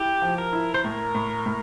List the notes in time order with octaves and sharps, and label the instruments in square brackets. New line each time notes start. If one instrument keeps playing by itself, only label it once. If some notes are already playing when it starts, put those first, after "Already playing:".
Already playing: [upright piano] E4 [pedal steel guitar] G4
[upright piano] F3
[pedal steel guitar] A#4
[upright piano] E4
[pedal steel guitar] C5
[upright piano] A2 [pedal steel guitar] A#4
[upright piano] A2
A2